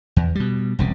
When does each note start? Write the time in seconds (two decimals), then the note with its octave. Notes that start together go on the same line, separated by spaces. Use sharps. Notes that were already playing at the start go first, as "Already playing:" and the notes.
0.16 E2
0.35 B2 G3
0.79 E1 C2 C#3